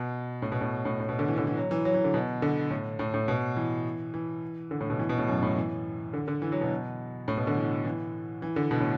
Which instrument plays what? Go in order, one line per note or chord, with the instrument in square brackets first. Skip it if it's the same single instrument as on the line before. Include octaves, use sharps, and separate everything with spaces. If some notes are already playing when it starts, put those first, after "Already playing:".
Already playing: [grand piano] B2
A2
B2
A2
A2
A2
B2
D3
E3
D3
E3
F#3
E3
F#3
E3
D3
B2
D3
A2
A2
A2
B2
E3
E3
D3
A2
B2
E3
B2
A2
F#2
A2
E3
D3
D3
E3
F#3
B2
A2
B2
D3
E3
E3
E3
D3
B2
A2